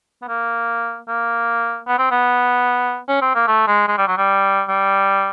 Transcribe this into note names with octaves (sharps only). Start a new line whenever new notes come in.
B3
A#3
A#3
B3
C4
B3
C#4
C4
A#3
A3
G#3
G#3
G3
F#3
G3
G3